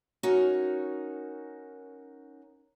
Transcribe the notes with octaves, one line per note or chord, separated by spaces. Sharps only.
C#4 D#4 F#4 A#4